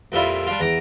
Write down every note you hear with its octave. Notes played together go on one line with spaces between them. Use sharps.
F2 A#2 G3 E4 F4
G3 D4 F4
E2 A#5 D6